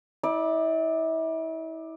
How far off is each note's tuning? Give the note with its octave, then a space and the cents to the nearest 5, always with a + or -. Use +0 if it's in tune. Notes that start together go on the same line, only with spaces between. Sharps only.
E4 -35 D5 +15